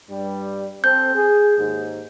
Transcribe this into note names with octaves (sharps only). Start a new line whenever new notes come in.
G2 G3
C4 A4 G6
G#4
D#2 G#2